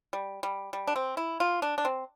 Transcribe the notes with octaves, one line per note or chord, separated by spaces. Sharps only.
G3
G3
G3
D4
C4
E4
F4
D4
D4
C4